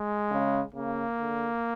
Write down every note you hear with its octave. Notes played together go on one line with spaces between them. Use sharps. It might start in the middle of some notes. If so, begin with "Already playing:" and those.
Already playing: G#3
C#3
C#3 A#3
D3